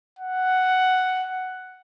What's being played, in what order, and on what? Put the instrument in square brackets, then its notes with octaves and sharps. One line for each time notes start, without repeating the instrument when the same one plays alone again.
[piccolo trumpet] F#5